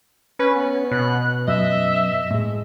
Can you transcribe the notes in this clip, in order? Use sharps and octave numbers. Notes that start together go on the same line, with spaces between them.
C#4 B4
B3
B2 F#6
F#2 D#5 E5
A2 G#3